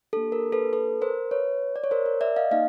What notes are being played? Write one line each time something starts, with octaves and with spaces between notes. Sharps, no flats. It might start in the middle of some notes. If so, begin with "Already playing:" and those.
A#3 D4 G4 A4
A#4
A4 B4
A4 B4
A#4 C5
B4 C#5
D5
C#5
A#4 C5
A#4
D5 E5
D#5 F5
A#3 D#4 D#5 F5